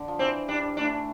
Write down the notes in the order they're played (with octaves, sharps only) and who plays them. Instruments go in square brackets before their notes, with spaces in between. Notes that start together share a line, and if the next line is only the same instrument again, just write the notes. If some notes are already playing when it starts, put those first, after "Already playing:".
Already playing: [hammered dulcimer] D3
F3
[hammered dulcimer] E3 [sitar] C4
[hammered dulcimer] G3 [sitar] D4
[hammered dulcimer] A3 [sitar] D4